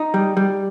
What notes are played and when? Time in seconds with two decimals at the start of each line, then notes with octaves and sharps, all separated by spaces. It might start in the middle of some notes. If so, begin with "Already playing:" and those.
Already playing: D#4
0.14 G3
0.37 G3